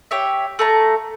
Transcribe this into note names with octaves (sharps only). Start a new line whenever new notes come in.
G4 C#5 E5
A3 A5 A#5